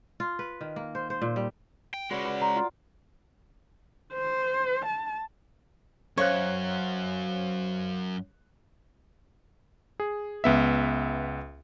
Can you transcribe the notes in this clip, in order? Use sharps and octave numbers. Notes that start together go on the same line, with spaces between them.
F4
B4
D#3
A#3
C5
C5
A#2
G3
G5
G#3 C#4 F#4 B4 D5
B4
C5 A#5
F4
C5
A5
F#2 C5 C#5 F5 F#6
G#4
C#2 B3 E5